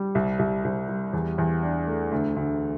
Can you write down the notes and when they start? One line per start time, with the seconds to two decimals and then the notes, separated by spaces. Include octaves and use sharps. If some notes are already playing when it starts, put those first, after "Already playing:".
Already playing: G3
0.15 C2
0.39 C2
0.64 C2
0.88 G3
1.13 E2
1.38 E2
1.63 D4
1.87 A3
2.12 D2
2.36 D2